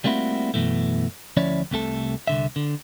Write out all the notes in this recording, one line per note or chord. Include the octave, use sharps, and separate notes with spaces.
G3 A3 A#3 C4 E4 F#4
F#2 B2 E3 A3
D2 F3 C#4 E4 C#5 D5
C2 C3 A3 A4
C2 D3 E5
D3